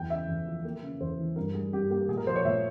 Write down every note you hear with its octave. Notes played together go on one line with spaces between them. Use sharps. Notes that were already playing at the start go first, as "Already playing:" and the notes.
Already playing: E2 G5
C#3 E5
E2
F3
A#3
C#3
E2 C5
E3
G2 A#4
G3 G#4
G2 G4
A#3 G4
A#2 G#4
A#4
F3 C5
C#5
A#2 E5